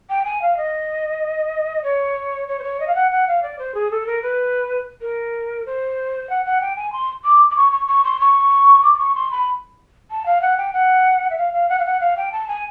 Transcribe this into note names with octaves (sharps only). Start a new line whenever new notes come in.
G5
G#5
F5
D#5
C#5
C#5
C5
C#5
D#5
F5
F#5
F#5
F5
D5
C5
G#4
A4
A#4
B4
A#4
C5
F#5
F#5
G5
G#5
C6
D6
D6
C#6
C#6
C#6
C6
C#6
D6
D6
C#6
C6
B5
A5
F5
F#5
G5
F#5
E5
F5
F5
F#5
F5
F#5
F5
G5
A5
G#5